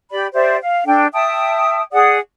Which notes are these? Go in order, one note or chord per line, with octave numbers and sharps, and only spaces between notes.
G4 D5 B5
G4 C5 D5 E5
F5
D4 A4 G5
E5 G5 A5 D#6
G#4 D5 F#5 D#6